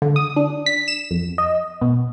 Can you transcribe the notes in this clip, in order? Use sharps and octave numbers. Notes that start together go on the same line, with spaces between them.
D3
D#6
D4
B6
E7
F2
D#5
B2